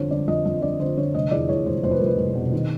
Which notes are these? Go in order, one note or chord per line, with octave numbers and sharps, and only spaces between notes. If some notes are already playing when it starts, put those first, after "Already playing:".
Already playing: F2 D3 C5 C#5
D3 D5
F2 D#5
F2 D#5
D3 D5
D3 C5
D3 C#5
F1 D#5
E2 D5
E2 C#5
F1 C5
F1 C5
B4
A#4
F1 B4
F1
B2
D#3